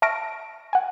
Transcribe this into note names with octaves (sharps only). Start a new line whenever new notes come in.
E5 A5 C#6 F6 A#6 D7
F#5 G#5